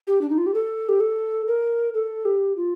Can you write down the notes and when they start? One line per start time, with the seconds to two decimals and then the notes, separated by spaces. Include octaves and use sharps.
0.07 G4
0.22 D4
0.30 D#4
0.38 F4
0.46 G4
0.54 A4
0.89 G4
1.00 A4
1.48 A#4
1.94 A4
2.25 G4
2.57 F4